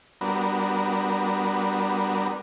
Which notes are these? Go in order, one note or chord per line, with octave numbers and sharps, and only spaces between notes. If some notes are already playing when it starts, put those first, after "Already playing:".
G3 B3 D4 F#4 A#4